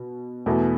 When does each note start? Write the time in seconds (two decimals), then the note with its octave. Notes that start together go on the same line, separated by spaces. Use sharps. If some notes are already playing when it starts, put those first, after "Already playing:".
Already playing: B2
0.46 E2 B2 A3